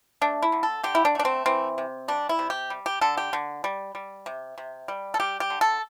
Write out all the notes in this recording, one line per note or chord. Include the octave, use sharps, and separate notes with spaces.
A3 D4
E4
D3
A4
D3 G4
E4
D4
A3 D4
C4
E3 C4
C3
G3 D4
E4
C3
G4
G3
G4
D3 A4
G4
D3
G3
G3
C3
C3
G3
A4
G3 G4
G4
D3
A4